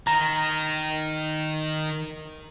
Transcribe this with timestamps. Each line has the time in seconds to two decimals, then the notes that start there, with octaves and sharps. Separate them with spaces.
0.07 D#3 A#5